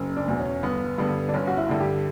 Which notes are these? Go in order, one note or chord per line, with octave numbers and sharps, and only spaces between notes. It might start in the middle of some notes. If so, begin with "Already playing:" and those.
Already playing: F#1
D4
E2 B2
C#4
G1 B3
G2 D3 B3
D4
G1 C#4
F#4
E4
G2 D3
G4